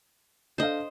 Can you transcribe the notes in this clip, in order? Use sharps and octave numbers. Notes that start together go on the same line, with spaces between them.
D4 A4 C5 D#5 F5